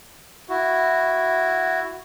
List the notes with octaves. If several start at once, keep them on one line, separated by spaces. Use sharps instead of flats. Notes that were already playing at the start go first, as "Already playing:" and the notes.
E4 F#4